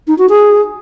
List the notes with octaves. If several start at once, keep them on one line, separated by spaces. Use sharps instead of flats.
D#4
F#4
G#4